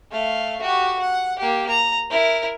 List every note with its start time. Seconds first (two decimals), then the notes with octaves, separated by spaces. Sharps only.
0.12 A3 F5
0.61 F#4 G4
1.00 F#5
1.39 A#3 G4
1.69 A#5
2.10 E4 A#4